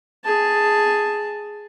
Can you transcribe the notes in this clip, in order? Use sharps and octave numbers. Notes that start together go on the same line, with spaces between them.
G#4 A5